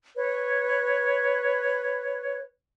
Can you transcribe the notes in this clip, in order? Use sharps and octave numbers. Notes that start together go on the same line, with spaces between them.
B4 C#5